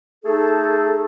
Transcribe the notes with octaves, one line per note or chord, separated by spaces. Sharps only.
A3 D#4 G#4 A4